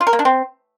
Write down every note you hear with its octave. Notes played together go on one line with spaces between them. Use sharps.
F4
A#4
A#3
D4
C4